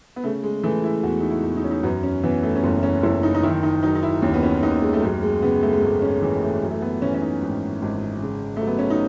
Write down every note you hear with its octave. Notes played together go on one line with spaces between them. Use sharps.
B3
C#3 A3
G#3
E3 A3
E4
E2 F#4
D#4
E4
E2
D#4
C#4
D#4
F#2 B3
C#4
E3 B3
A3
C#4
F#1 B3
C#4
F#1 E4
D#4
D#4
D#3 E4
D#4
F#3 D#4
D#4
E4
D#2 C#4
B3
C#4
D#2 D#4
G#3
A3
F#2 G#3
G#3
C#3 B3
A3
G#3
G#1 A3
C#4
E3
A3
F#2
A3
B3
E3 C#4
C#4
D#4
G#1
G#1
C#3
F#3 A3
B3
C#4
D#4